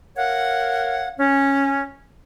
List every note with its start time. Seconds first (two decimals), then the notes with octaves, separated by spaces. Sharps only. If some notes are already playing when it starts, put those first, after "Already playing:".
0.16 A#4 C#5 F5 F#5
1.18 C#4